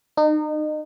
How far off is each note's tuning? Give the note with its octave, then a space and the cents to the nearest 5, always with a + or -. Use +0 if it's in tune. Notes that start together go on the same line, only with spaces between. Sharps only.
D#4 -30